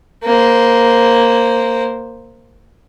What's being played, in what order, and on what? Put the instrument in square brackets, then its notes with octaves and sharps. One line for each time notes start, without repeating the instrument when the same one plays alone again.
[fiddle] A#3 C5